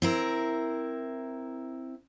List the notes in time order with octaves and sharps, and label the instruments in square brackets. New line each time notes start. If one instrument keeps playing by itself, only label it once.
[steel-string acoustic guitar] C4 E4 A#4